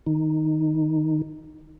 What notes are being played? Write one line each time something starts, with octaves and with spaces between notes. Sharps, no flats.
D#3 D#4